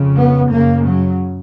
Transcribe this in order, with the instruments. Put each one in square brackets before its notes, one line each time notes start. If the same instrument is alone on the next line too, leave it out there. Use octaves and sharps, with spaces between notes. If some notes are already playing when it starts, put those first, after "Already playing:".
Already playing: [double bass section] F2 C#3
B3
F#2 C#3 A#3
F#3